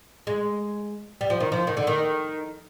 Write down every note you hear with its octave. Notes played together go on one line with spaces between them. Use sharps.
G#3
G3
F3
D#3
F3
D#3
D3
D#3